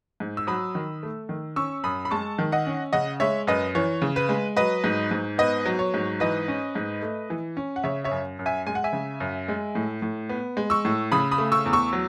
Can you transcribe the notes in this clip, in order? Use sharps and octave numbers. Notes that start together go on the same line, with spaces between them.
G#2
E6
F#3 B5 D#6
D#3
A3
D#3
C#4 C#6 E6
F#2 B5 D#6
B5
G#3 A5 C#6
D#3
D#5 F#5
C#4
C#3 D#5 F#5
G#3 C#5 E5
F#2 B4 D#5
E3 C#5
C#3
B4
G#3
F#3 B4 D#5
G#2
G#2
B3 B4 D#5
F#3
C#5
G#2
E3 B4 D#5
C#4
G#2
A3
E3
C#4
F#5
C#3 C#5 E5
C#5 E5
F#2
F#2
E5 G#5
G#3 G#5
F#5
E5 G#5
C#3
F#2
G#3
A2
A2
B3
G#3
C#6 E6
A2
C#3 B5 D#6
B5 D#6
A3
C#6 E6
E2
C#6 E6
F#3